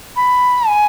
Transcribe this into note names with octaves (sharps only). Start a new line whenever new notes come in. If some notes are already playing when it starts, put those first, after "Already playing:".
B5
G#5